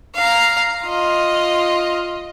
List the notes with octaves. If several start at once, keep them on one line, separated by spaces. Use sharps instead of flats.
F5 A#5
F4 D#5